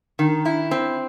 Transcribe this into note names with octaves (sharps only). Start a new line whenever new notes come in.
D#3
E4
C4